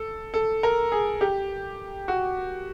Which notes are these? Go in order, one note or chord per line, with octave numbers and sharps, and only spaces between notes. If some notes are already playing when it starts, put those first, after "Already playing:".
Already playing: A4
A4
A#4
G#4
G4
F#4